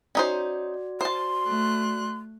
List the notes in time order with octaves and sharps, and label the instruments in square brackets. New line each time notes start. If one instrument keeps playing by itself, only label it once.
[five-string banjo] C#4 D#4 C5 [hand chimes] F#4 D5
[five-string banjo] C5 A5 [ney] C6
[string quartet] A3 F#6